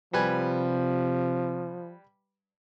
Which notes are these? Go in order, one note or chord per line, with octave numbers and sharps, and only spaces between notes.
C3 F3 G3 B4 G#5